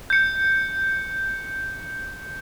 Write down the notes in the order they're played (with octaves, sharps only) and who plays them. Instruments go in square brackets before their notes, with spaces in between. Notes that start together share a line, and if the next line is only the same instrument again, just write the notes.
[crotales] G6 C#7